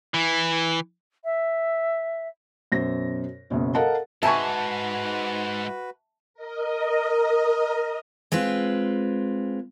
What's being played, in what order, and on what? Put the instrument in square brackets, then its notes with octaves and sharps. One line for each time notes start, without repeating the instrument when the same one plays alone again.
[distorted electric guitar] E3
[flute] E5
[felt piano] F#2 B2 C5 A#6
F#1 F#2 B2 C#4
A4 A#4 D#5 F5 F#5 A5
[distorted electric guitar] G#2 [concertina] F#4 B4 [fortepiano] E5 G#5 C#6 [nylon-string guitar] A5
[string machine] A#4 D#5
[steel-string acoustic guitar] G#3 C4 F4 B4